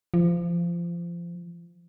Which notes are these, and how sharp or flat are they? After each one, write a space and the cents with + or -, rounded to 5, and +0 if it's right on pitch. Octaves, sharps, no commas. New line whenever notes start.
F3 -25